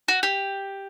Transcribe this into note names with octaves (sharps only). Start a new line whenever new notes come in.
F#4
G4